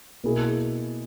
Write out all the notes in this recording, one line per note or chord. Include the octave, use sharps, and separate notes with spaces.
B2 A#3 E4 G#4